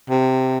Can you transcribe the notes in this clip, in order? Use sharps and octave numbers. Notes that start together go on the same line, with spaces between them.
C3